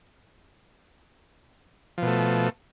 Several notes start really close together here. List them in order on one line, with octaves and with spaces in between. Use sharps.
F3 B2 A3